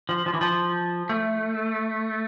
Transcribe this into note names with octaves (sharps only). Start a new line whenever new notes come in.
F3
F3
E3
F3
A3